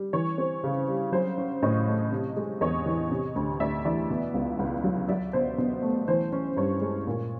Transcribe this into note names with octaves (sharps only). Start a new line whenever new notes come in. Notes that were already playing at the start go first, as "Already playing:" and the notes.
Already playing: G3
E3 C#5
C4
C#3
G3
F#3 C5
C#4
A2 C#5 D#5
A3
C3
G#3
E2 C#5 D#5
E3
C3
D2
D2 D5 E5
E3 D5 E5
B2
C#2
C#2
F#3
F#3 D5 E5
B2 C5
B2
A3
E3 C5
C#4
G2 C#5
G#3
A#2